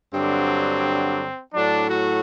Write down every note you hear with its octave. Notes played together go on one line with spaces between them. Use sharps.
G2 D3 F#3 C4
A2 F#3 D4
F#4